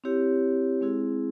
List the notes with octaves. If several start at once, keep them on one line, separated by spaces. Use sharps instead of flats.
C4 E4 G4 C#5
G#3 C4 E4 G#4